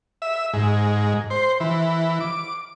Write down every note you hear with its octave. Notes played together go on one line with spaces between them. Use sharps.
E5
G#2
C5
E3
D6